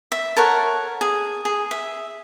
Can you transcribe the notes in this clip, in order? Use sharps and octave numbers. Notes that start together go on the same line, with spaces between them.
E5
A4 A#4 C#5 F#5
G#4
G#4
E5